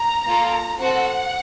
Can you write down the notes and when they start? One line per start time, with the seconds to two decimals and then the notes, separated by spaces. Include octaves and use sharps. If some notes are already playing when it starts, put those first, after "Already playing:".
Already playing: A#5
0.26 A#3 F4 A4
0.80 C4 F#4 A4 F#5